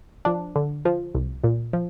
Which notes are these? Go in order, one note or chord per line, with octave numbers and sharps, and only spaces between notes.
F3 D4
D3
F3
C2
A#2
F3